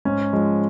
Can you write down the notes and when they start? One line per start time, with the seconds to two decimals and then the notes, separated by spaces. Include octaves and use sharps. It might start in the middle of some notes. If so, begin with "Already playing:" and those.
0.05 G#2 C#4
0.33 F3 G#3